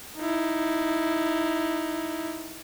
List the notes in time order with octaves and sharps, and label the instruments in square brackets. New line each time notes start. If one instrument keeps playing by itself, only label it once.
[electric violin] D#4 E4